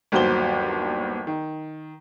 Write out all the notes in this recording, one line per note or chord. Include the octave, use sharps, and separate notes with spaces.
G1 D#2 F#3 F#4 C5 G7
D#3